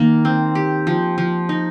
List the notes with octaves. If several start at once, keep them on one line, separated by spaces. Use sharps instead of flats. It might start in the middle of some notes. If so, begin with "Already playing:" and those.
Already playing: D#3 A#3
C4
G4
F3
F3
D#4